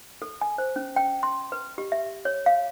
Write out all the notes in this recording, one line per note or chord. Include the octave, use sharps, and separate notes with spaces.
A4
G#5
C5
C#4
G5
C6
B4
G4
E5
C#5
F5